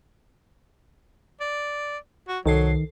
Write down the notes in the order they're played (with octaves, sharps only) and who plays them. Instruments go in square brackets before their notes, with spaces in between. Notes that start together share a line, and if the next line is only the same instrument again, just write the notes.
[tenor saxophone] D5
F#4
[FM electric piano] C2 A4 C7 [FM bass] D#3 [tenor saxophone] F#3